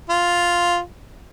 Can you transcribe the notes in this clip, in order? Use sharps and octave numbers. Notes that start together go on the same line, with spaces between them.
F4